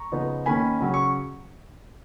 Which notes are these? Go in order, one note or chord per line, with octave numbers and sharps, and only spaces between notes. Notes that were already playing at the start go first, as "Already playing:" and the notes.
Already playing: A#5 C#6
C#3 F3 B3 D#4
D#3 A#3 C#4 G#5 B5
C#3 F#3 C#4
C#6